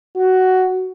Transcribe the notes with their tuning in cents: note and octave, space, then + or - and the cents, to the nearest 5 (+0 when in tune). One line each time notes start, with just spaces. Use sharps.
F#4 +10